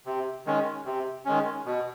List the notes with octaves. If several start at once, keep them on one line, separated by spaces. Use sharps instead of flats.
C3
D#3 G#3 C#4
C3
D#3 G#3 C#4
B2